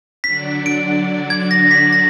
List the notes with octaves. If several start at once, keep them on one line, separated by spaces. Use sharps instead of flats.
D3 F#3 D4 F#4 D5 B6
D7
G#6
A#6
B6
A#6